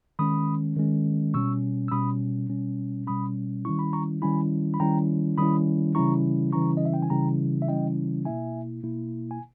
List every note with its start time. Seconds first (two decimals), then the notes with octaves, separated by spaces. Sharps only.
0.19 D#3 G#3 C#4 B5 D#6
0.77 D#3 G#3 C#4
1.34 B2 G3 C#4 C#6 E6
1.88 E6
1.91 B2 G3 C#4 B5 D#6
2.49 B2 G3 C#4
3.07 B2 G3 C#4 B5 D#6
3.65 D#3 G3 C#4 E4 C#6
3.79 B5
3.93 A#5 C#6
4.22 D#3 G3 C#4 E4 G#5 B5
4.74 B5
4.80 D#3 G3 C#4 E4 G5 A#5
5.38 D#3 G3 C#4 E4 B5 D#6
5.95 C#3 E3 G3 C#4 E4 A#5 C#6
6.53 C#3 E3 G3 C#4 E4 A#5 C#6
6.77 D#5
6.85 E5
6.94 G5
7.02 G#5
7.10 C#3 E3 G3 C#4 E4 G5 A#5
7.62 E5
7.68 C#3 E3 G3 C#4 E4 D#5 G5
8.25 B2 A#3 E4 E5 G#5
8.83 B2 A#3 E4
9.31 G#5